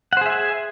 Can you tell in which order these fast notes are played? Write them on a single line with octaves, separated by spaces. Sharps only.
F#5 C5 G#4 E5 G#5